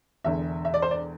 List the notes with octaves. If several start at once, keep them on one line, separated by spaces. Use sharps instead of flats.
E1 E2 D3 E5
E5
D5
C5
D5